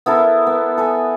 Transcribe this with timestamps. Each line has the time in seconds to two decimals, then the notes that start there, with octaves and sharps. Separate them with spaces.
0.06 B3 E4 A4 A#4
0.47 B3
0.78 A4 B4 G#5